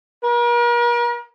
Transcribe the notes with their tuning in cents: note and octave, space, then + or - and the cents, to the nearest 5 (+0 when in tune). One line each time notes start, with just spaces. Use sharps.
A#4 +40